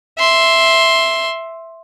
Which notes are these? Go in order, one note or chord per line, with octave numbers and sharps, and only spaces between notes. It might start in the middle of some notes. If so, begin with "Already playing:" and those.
E5 C6